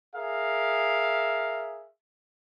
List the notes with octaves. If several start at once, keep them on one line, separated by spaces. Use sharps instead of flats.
G#4 A#4 E5 F5